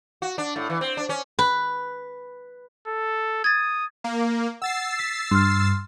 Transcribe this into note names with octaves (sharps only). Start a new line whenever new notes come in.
F#4
D4
A2
E3
C4
D4
C#4
B4
A4
D#6 G#6 A6
A#3
F#5 E6 A6 C7
B6
G2 C6 F6